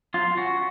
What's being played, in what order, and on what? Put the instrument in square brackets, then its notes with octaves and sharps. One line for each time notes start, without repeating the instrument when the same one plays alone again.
[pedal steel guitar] F#3 F4
C#4 F#4